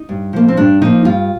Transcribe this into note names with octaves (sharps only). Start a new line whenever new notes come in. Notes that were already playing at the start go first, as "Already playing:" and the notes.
Already playing: D#4
G2
F3 A#3
C4
G2 D4
F3 A#3 D#4
G2 F4